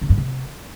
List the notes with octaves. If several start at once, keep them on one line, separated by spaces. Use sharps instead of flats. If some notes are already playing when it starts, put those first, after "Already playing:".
C3
G2
C3